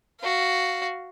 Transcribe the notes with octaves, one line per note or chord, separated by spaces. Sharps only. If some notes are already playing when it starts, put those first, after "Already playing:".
F#4 F5